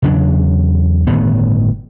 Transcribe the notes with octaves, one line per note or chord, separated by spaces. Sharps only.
E2 C#3 F#3 D4
G1 A2 D#3 B3